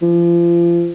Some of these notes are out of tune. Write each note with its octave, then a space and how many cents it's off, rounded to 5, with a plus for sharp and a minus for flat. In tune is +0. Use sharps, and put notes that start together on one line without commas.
F3 -35